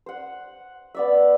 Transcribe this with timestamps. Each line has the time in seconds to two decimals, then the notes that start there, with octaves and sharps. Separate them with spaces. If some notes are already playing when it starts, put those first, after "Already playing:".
0.06 C5 F#5
0.95 B3 D5 E5